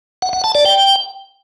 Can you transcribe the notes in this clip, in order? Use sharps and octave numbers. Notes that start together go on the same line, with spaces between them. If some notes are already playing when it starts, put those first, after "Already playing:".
F#5
F#5
A5
D5
G5